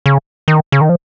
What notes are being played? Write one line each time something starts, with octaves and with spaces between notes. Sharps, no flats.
C#3
D#3
C#3
D#3
F3